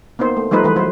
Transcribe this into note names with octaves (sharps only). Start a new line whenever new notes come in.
A#3 B3 D#4 C5
A3
F3 G3 A3 D#4 B4 C5
E3 G#3 A3 B4
F#3 C5